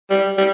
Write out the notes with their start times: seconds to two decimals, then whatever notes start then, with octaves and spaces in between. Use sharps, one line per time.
0.10 G3
0.38 G3